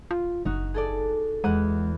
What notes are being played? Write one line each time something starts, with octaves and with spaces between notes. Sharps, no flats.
F4
F#1 D#4 F#4
G#4 A4 D5
E2 G#3 F#5 D#7